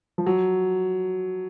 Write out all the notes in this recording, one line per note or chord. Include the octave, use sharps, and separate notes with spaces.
F3
F#3